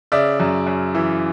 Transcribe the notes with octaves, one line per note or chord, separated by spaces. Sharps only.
C#3 D5 E5
F#2
F#2
E3